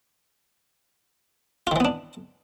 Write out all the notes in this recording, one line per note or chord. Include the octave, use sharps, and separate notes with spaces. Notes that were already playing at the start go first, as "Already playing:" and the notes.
D#3 E3 B3 D4 F4